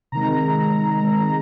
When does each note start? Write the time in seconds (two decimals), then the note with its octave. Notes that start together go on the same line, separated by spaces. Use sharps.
0.12 C3 D#3 G#3 A#5
1.02 C3 D#3 G#3